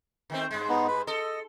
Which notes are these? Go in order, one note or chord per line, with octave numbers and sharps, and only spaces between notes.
D#3 A3 C4
G2 G#3
B3 D#4
B4
A4 D#5